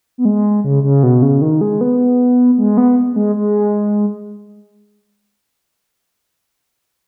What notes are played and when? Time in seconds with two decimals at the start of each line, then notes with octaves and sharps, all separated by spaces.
0.18 B3
0.25 G#3
0.64 C#3
0.83 C#3
1.03 B2
1.22 C#3
1.42 D#3
1.61 G#3
1.81 B3
2.58 G#3
2.77 B3
3.12 B3
3.16 G#3
3.36 G#3